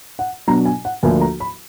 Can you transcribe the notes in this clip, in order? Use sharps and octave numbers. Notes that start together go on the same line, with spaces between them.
F#5
B2 F#3 D4 A#5
G#5
F#5
D2 D3 F3 A#3 D4 G#5
A#5
B5